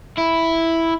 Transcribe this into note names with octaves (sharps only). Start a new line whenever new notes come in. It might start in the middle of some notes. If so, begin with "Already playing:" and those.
E4